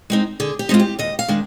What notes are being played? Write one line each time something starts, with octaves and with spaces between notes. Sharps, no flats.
G#3 C4 D#4
D3 G#4
G4
G#3 C4 D#4 F4
G4
D#2 D#5
F5
D#3 G#3 D4